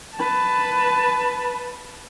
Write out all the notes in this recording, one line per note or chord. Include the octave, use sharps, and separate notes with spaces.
B4 A5